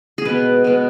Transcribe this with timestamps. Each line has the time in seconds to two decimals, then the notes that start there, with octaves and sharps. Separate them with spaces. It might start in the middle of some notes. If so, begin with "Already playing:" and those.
0.18 G#4
0.25 B2 G#3 B3 B4
0.64 B2 G#3 B3